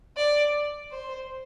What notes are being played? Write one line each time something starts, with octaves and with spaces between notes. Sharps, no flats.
D5
C5